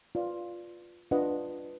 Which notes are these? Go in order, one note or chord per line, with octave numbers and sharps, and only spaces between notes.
F4 B4 D5 F5
D4 F4 B4 D#5 F#5